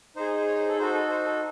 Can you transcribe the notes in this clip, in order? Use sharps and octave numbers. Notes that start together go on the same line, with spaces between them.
D#4 G#4 C5
C5
C#5
C5
A4
D#4 F#4 A4 C5
A4
C5
A4